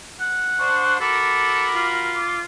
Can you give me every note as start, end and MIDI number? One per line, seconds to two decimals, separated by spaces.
0.20 0.97 78
0.59 0.98 62
0.59 0.98 72
0.59 0.97 85
1.00 2.25 66
1.00 1.67 69
1.00 2.25 70
1.00 2.25 83
1.00 1.85 86
1.75 2.45 65
2.15 2.38 86